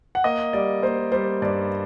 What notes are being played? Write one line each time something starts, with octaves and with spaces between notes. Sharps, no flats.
F#5
A#3 D#5
G3 D5
A#3 C5
G3 C5
G2 D5